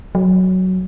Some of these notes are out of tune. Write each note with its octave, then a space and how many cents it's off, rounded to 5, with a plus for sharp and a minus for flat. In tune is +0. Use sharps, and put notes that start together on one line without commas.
F#3 +5